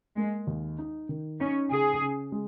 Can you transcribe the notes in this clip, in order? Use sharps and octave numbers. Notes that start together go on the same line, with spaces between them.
G#3 A#3
D#2
D#4
D#3
C#4 D#4
C#3 G#4
C#3
G#3